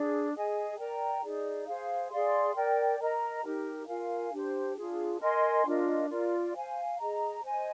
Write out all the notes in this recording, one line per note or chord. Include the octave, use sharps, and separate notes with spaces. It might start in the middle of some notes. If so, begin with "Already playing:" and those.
Already playing: D4 G#4 D5
G#4 D#5 G#5
A#4 D5 G5 A#5
D#4 G#4 D5
G#4 C5 F5
G#4 D5 F5 C6
A#4 D5 G5
A#4 D#5 A#5
D#4 G4 A#4
F4 A#4 F5 G#5
D4 G4 C5
D4 F4 G#4
A#4 D#5 G#5 C6
D4 F4 A#4 D#5
F4 A#4 D5
C5 F5 G#5
G#4 D#5 A#5
C5 D#5 G#5